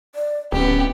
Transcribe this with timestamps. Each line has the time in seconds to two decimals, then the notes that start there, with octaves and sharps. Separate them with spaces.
0.15 D5
0.52 D1 B3 C#4 G4